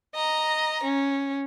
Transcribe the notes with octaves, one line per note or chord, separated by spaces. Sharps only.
D#5 A#5
C#4